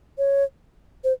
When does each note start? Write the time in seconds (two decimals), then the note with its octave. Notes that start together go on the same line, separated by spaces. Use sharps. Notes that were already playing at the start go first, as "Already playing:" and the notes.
0.18 C#5
1.04 C5